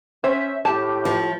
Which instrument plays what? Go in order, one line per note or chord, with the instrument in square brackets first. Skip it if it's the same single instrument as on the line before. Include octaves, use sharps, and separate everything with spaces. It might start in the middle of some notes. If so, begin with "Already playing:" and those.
[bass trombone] C#4 [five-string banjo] C5 [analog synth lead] E5
[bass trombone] A2 [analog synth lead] G4 [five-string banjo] A5
[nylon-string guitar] F3